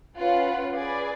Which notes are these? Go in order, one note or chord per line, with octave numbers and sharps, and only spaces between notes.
C#4 F4 B4 F#5
G#4 B4 D5